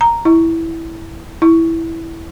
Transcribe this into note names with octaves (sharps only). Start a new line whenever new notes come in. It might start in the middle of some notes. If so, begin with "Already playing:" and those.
A#5
E4
E4